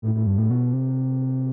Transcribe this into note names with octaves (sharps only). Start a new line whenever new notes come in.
A2
A2
G2
A2
B2
C3